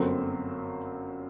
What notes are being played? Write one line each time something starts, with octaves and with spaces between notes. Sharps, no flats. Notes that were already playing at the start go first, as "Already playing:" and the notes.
Already playing: G1 F#2 F#3 A3 C4